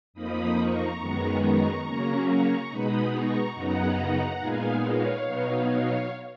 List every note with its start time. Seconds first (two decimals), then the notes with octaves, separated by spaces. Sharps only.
0.14 F2 F3 A#3 D#4 B5 D#6
0.56 A#5 C#6
0.99 F#2 D#3 G#3 B3
1.41 A#5 C#6
1.84 C#3 F#3 A#3 C#4
2.26 A#5 C#6
2.68 B2 G#3 B3 D#4 B5 D#6
3.11 A#5 C#6
3.54 F#2 C#3 F#3 B3 D#4 F#5 A#5
4.38 A#2 G#3 B3 D#4 F5 G#5
4.81 C#5 F5
5.23 B2 F#3 B3 D#4
5.66 C#5 F5